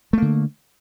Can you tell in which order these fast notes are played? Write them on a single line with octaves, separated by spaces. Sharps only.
A3 A#3 D3